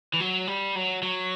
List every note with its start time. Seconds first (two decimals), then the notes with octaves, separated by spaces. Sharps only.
0.14 E3
0.20 F#3
0.47 G3
0.75 F#3
1.02 F#3